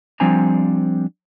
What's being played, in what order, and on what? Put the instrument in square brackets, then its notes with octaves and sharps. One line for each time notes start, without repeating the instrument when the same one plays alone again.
[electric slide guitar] F3 G3 C4 D4 G#5 A#5